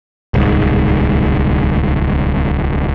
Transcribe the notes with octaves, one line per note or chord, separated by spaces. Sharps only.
D1 C2 G#2